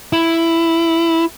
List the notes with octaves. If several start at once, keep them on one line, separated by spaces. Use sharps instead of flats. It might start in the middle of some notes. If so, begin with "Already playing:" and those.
E4